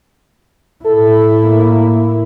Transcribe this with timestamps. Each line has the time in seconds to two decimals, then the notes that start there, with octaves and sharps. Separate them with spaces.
0.85 A2 E4 A4
1.44 A#3